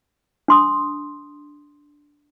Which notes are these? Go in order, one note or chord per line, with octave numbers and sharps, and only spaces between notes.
D4 C6 D#6